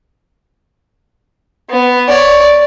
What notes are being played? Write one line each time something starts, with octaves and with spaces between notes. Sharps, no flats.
B3
C#5 D5